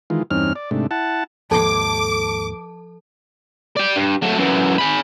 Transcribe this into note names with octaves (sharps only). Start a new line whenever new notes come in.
D#3 E3 G#3 F4
E2 G2 C4 C#4 D#4 F6
D5
G#2 C3 A3 D4
E4 F#5 A5
D#2 G#2 F3 A4 A5 D6
D5 G5
G2
F#3 A3
F#2 E3
G#4 B5